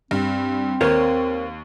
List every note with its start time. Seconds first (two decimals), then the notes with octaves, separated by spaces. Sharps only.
0.11 G2 C4
0.81 D#2 A#4 C5 C#5